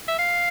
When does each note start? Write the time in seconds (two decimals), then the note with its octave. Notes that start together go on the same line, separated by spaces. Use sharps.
0.08 E5
0.19 F5